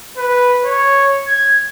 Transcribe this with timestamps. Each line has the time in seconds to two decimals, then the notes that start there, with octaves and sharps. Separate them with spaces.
0.17 B4
0.65 C#5
1.27 G#6